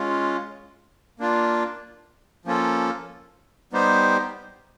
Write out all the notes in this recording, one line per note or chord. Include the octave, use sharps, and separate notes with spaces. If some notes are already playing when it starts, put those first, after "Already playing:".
Already playing: G#3 C#4 F4
A#3 D4 F4
F3 A#3 C#4 F4 A4
G3 B3 D#4 G4 C5